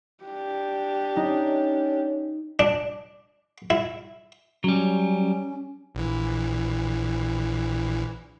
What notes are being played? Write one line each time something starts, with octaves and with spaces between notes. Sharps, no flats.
D4 G4
C#4 D#4
D4
E4
F#3 G3 C#4
A#1 E3